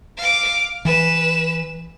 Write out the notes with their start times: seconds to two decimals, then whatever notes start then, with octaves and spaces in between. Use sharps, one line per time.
0.17 F5 D6
0.85 E3 B4 E7